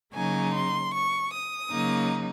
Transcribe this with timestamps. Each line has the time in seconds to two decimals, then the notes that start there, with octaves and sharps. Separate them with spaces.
0.12 C#3 F#3 A#3 D#4 G#5
0.53 C6
0.92 C#6
1.32 D#6
1.71 C#3 F#3 A#3 D#4